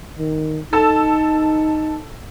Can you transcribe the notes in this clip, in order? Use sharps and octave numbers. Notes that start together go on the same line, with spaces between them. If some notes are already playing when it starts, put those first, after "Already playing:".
D#3
D#4 A4 A5 E6